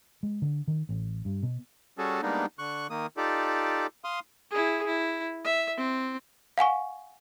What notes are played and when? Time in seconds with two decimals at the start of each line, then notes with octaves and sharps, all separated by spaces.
0.23 G#3
0.42 D3
0.68 D#3
0.89 A1
1.25 G2
1.43 B2
1.98 G3 C#4 F#4 G#4 A4
2.22 G3 G#3 A#3 B3 D4 D#4
2.59 D3 C#6 F#6
2.90 D#3 A#3 D#6
3.17 D#4 F4 G4 A4 D5
4.04 F5 C6 D#6
4.51 E4 G#4
4.87 E4
5.45 E5
5.77 C4
6.58 F5 F#5 G#5 C#6